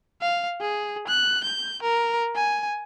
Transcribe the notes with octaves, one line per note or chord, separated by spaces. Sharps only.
F5
G#4
F#6
G6
A#4
G#5